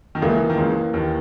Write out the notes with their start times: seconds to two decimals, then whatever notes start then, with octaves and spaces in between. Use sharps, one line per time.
0.15 D#3
0.22 C#2 C#3 E3 A#3 E4
0.50 D#3
0.57 C#2 C#3
0.93 D#2 D#3